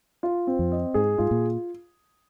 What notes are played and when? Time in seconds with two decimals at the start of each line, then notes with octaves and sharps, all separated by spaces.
0.23 F4
0.47 C4
0.59 F2
0.72 D#5
0.94 G#2 G#4
1.18 G#2 F4
1.31 A#2